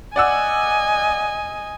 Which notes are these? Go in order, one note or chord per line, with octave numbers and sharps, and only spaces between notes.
D5 D#5 F#5 G#5 E6